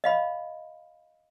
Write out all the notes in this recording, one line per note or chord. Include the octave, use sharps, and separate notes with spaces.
D#5 F5 B5